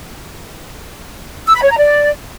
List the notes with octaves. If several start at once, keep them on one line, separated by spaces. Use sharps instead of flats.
E6
B5
C#5
A#5
D5